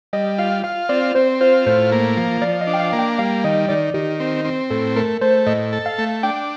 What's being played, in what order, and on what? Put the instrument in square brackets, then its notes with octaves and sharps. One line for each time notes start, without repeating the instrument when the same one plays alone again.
[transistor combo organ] G3 [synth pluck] D#5
[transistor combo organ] F4 [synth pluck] F5
[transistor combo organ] F4 [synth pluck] F5
[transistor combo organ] C4 [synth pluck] D5
[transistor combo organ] C4 [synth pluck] C5
[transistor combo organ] F4 [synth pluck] C5
[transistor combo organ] A2 [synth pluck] C5
[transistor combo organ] A#3
F3
[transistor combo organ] F3 [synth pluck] D5
[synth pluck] D#5
[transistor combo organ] D4
[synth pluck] G5
F5
[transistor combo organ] A#3
[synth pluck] G5
[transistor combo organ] G3 [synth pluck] F5
[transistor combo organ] D#3 [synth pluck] D#5
[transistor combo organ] D#3 [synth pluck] D5
[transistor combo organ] D#3 [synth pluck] G4
[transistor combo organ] C4
C4
[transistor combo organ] A2 [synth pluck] A4
[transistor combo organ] A3 [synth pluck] A#4
[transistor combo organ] A3 [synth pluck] C5
[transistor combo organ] A2 [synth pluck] D#5
[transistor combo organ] A4
[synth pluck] F5
[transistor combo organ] A3
[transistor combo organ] D4 [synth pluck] G5